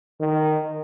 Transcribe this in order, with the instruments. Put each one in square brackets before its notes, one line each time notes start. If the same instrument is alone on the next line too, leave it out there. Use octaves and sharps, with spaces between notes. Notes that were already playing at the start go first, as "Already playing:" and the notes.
[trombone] D#3